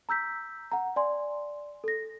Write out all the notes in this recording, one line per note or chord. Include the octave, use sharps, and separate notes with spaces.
A#5 E6 G6 B6
F#5 A#5
D5 G#5 C6
A4 A#6